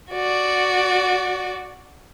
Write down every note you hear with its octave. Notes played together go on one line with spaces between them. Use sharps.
F#4 D5